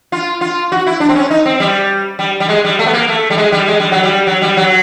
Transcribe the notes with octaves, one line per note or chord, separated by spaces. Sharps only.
F4
F4
F#4
E4
D4
C4
C#4
D#4
C4
G3
G3
G3
G#3
G3
A3
B3
A#3
A3
G3
G#3
G3
G#3
G3
F#3
G3
F#3
G3
F#3